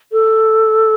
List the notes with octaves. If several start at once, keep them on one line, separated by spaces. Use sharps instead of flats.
A4